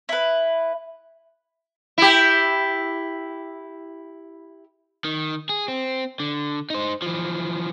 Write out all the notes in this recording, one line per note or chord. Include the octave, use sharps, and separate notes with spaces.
E4 B4
E4 G4
D#3
G#4
C4
D3
D#4 C5
E3 F3